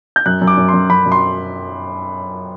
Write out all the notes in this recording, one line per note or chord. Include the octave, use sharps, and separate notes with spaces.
G6
F#2 F#6
F#2
D6
F#2
C6
F#2
F#2 B5
F#2
C6